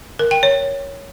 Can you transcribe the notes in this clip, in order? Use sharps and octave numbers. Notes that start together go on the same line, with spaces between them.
A#4
G5
C#5